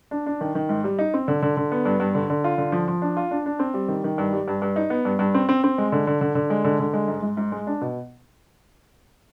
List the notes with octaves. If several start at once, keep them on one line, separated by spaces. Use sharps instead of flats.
D4
D4
D#3
D#3
G#2
G3
D#4
C4
D3
D3
D3
B3
G2
G2
D3
D3
F4
D3
F3
F3
D4
F4
D4
D4
C4
G3
D#3
D#3
G2
G3
G2
G2
D#4
B3
G2
G2
C4
C4
C4
G#3
D3
D3
D3
D3
G#3
D3
D3
G#3
G#2
G#2
G#2
G#3
D4
B2